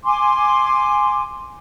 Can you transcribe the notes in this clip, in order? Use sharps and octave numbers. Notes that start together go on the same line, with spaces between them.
G#5 C6 D6